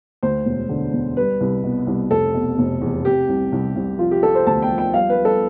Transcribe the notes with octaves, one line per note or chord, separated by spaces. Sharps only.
D2 C5
E1
D3
E1
G3 B4
C2
B2
C2
F1 A4
B2
F1
E2
C3 G4
C2
C2
C2
F3 F4
G4
F3 A4
C5
D2 A5
G5
F3
G5
G3 F5
B4
G3
A4